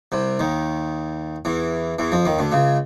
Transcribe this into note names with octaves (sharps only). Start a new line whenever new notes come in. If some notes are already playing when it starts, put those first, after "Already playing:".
C2 C3
D#2 D#3
E2 E3
E2 E3
F2 F3
D#2 D#3
D2 D3
C#2 C#3